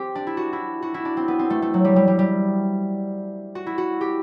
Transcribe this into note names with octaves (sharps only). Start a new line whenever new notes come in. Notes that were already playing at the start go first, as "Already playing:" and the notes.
Already playing: C4 G4
D4
E4
F#4
E4
F#4
E4
D4
C4
B3
C4
A3
A3
F#3
G3
G3
G3
G3
F#4
E4
F#4
G4